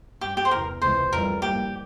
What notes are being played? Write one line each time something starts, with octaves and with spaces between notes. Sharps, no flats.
G2 G3 C#4 G4
G4
C5
E2 C3 E3 A#4
C#2 C3 E3 G#3 C5
F1 F2 C#3 E3 G3 A#4
G#2 G3 A#3 G4